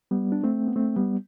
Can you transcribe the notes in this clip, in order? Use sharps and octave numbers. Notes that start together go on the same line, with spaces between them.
G3 B3
D4
A3 C4
B3
A3 C4
G3 B3